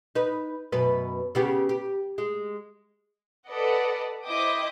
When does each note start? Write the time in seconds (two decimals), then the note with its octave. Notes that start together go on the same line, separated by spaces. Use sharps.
0.15 D#4 B4
0.72 F#2 B2 B4
1.35 C#3 B3 G4
1.69 G4
2.18 G#3
3.49 A4 B4 D5 D#5 F#5
4.24 E4 C5 D#5 G5 D6 D#6